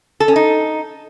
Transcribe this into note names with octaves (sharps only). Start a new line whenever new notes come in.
A4
C#4
D#4